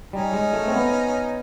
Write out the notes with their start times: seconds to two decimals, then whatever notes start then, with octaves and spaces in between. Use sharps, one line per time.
0.13 G3 C#4 D#4
0.34 G#3
0.54 A3
0.68 C4
0.73 B3